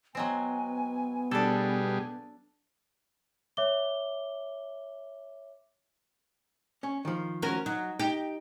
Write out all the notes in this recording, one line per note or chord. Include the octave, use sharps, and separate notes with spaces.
F#3 G#3 B3 C4 G#5
B2 G3 D4 G#4 A4
C#5 E5 D6 G7
C#4
D#3 F3
C#4 F#4 A#4
F#3 D#4
D#4 G4